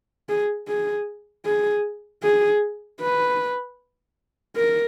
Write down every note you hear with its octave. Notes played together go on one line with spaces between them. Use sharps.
G#4
G#4
G#4
G#4
B4
A#4